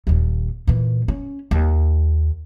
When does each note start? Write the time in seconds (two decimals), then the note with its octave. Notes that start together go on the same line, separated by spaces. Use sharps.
0.07 D#1 D#2
0.67 A#2 E3
1.08 C#4
1.51 D#2